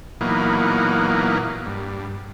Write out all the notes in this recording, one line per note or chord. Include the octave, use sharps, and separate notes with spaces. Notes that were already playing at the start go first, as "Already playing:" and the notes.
A#2 E3 F#3 A#3 B3 D#4
G2